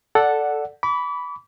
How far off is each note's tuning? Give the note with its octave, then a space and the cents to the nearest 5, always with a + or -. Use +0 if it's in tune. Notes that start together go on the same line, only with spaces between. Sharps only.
A4 +0 D5 +0 F#5 +0
B5 +0 D6 -40